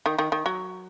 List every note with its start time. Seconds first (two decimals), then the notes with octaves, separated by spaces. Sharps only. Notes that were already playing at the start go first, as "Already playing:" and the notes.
0.06 D#3
0.18 D#3
0.32 D#3
0.46 F#3